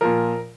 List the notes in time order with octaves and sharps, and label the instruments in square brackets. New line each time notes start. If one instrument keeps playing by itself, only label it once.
[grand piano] A#2 F3 A#4